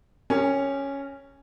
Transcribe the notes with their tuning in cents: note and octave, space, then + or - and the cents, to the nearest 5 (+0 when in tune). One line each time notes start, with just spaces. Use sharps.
C#4 +0 G4 +30 A#4 -25